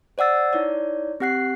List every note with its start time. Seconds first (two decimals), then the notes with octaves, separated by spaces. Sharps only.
0.18 C5 D5 F#5 E6 A6
0.53 D#4 E4 C#5 D5
1.20 C4 G4 F#5 F#6 C7